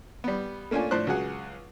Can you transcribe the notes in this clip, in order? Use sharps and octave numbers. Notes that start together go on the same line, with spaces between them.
G3 B3
A3 A#3 C#4 D4 F4 G#5
A2 F3 D4 C5 F#6
C#2 F#3 F#4 G#4 F#5